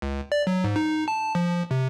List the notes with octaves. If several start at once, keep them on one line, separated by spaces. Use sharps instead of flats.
C#2
D5
F#3
G#2
D#4
A5
F3
C3